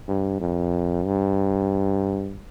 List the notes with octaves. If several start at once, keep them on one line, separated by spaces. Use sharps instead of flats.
G2
F2
G2